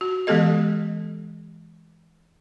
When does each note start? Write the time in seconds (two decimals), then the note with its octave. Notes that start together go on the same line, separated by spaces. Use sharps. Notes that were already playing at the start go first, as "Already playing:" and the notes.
0.01 F#4
0.27 E3 G#3 B3 G4 A4 D#5